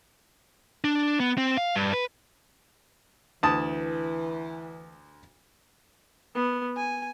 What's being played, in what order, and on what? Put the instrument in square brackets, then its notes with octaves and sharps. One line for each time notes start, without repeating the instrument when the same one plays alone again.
[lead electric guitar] D4
B3
C4
F5
G2
B4
[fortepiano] D2 A5 D#6 [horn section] E3
[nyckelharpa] B3
G#5